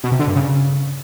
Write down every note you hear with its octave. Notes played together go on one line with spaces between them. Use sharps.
B2
C3
D3
G2
C#3